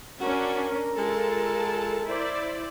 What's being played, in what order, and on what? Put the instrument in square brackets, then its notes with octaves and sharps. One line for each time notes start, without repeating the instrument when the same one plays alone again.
[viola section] C#4 D4 [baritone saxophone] F#4 [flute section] A#4 A#5
[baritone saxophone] G#3 [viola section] F4 A4 A5
[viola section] E4 C5 D5